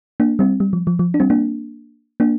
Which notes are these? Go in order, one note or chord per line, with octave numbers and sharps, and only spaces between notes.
A#3 D4
G3 C4
G3
F3
F3
F3
D4
G3 C4
A#3 D4
A#3 D4